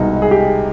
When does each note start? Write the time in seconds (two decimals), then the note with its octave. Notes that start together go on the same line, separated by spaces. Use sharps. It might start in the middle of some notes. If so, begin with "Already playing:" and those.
Already playing: C2 B2 G#3 D#4
0.22 G#4
0.31 G4